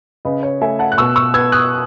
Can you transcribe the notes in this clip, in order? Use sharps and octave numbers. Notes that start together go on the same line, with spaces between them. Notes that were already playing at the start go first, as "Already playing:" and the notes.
C#3 B4 D#5
C#5
A3 E5 G#5
F#5 A5
F#6
B2 C#6 E6
C#6 E6
B3 E6 G#6
D#6 F#6